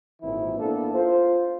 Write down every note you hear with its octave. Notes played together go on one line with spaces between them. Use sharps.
G#1 A#2 E3 C4 E4
A#3 B3 D4 E4 A4
F4 C5